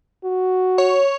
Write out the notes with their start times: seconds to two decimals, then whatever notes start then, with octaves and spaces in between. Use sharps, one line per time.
0.24 F#4
0.78 C#5